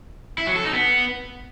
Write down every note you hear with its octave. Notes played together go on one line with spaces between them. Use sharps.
E4
F#3
A4
D#4
B3